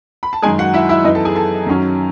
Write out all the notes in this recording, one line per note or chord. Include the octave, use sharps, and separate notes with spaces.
B5
A5
F#2 D#3 G#3 G#4 G#5
F#4 F#5
E4 E5
E4 E5
F#2 E3 B3 D#4 D#5
A4 A5
G#4 G#5
A4 A5
F#2 D#3 F#3 C#4